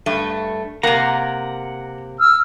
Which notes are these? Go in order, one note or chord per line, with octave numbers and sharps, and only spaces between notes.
G2 A3
C3 A#3 F#5 A#5
E6 F6